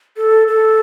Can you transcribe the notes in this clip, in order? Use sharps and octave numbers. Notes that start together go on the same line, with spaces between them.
A4
A4